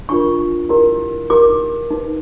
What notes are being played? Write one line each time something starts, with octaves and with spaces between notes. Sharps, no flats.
D4 F4 A#4 C#6
E4 G4 A#4
D#4 G4 A#4 D6
D#4 G4 B4